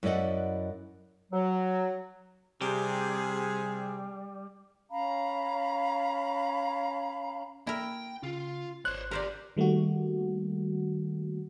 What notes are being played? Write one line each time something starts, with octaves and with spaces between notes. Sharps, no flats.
F#2 E4 B4 D5 D#5 F#5
F#3
C3 G3 G#4
C#4 F5 A#5 B5
A#3 E4 A#4 G5
C#3 F4
G#1 C5 C#5 C6 F#6
B3 G4 A#4 C5 D5
D#3 G3 A3 A#3 F#4